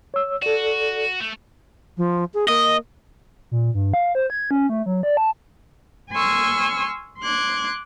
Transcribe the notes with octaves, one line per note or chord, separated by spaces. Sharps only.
C#5 E6
F#4 A4 D5
A3
F3
G#4
A#3 D#5
A#2
G2
F5
C5
G#6
C#4
A3
F#3
D5
A5
G#5 C6 C#6 E6 F6
C6 D6 F#6 G#6